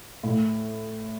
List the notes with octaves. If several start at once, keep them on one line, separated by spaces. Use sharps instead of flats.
A2